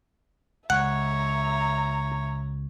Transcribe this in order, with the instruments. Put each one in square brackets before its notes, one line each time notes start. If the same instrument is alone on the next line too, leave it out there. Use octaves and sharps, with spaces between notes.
[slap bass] C#2 [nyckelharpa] C#5 [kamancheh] E5 A#5 [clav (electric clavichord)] F#5